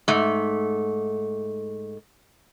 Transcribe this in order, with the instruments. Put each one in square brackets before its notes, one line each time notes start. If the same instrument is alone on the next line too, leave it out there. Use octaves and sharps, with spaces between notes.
[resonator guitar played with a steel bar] G#2 A3